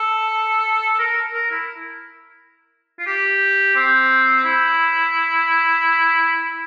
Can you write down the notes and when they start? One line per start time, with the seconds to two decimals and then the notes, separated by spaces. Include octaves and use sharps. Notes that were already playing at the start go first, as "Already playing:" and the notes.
Already playing: A4
0.99 A#4
1.34 A#4
1.51 E4
2.99 F4
3.06 G4
3.76 C4
4.45 E4